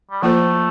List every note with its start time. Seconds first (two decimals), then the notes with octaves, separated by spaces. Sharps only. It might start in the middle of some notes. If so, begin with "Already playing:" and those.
0.11 G3
0.22 F3 A3 A#3 F4 A4 C5